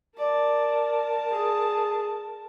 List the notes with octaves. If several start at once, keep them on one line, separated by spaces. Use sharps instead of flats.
A#4 D5 A5
G#4